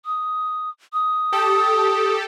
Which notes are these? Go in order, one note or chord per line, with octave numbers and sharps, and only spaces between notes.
D#6
D#6
G4 A4